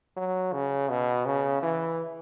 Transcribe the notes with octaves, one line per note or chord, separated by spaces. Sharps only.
F#3
C#3
B2
C#3
E3